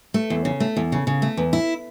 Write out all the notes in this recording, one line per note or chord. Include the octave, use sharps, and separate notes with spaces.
A3
E2
C#3
A3
E2
C#3
C#3
A3
E2
E4